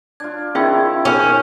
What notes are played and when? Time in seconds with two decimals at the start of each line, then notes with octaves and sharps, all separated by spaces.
0.20 D4 F4 G#6
0.55 D#3 F3 C#4 E4 F4 G#4 E5
1.05 C#4 A#4 C5